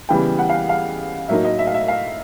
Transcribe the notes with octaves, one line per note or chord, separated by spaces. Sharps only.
C#3 E3 G3 B3 G5
F#5
F5
F5
A2 F#3 A#3 D#4 E5
D#5
E5
F5
E5
F5